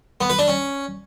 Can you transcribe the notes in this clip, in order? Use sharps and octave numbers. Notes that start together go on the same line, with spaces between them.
B3
B4
D4
C#4